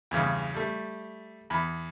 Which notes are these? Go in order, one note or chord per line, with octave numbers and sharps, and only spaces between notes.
E2 G2 C#3
G3 A3
E2 B5